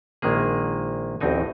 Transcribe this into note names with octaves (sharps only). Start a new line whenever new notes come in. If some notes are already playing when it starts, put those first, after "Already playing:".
A#1 D#3 G#3 A#3 G#4
A1 D2 A2 C4 D#4 G#5